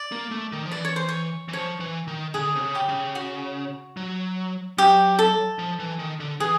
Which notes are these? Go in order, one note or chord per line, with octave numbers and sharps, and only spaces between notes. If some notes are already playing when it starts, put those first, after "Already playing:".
Already playing: D5
A#3
A3
D#3
F3
E3 D5
C#5
C5
C#5
E3
F3 C#5
E3
D#3
D3 G#4
C3
C#3
G4
C#3
F#4
F#3
F#3 G4
A4
F3
E3
D#3
D3
E3 G#4